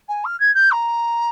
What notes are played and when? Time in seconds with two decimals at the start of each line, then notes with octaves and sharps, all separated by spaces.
0.08 G#5
0.24 F6
0.40 G#6
0.54 G6
0.71 A#5